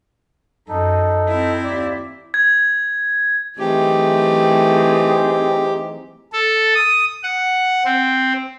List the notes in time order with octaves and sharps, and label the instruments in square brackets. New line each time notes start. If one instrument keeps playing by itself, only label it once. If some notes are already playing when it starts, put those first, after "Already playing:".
[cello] F#2 [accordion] D#4 A4
[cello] C4 E4
[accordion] D#2 D5
[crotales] G#6
[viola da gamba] E3 F#3 A3 [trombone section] C4 D#4 G#4 [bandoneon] G4
[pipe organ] A4
D#6
F#5
C4